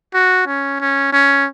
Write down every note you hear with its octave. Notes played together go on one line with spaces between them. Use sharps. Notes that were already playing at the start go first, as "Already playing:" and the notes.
F#4
C#4
C#4
C#4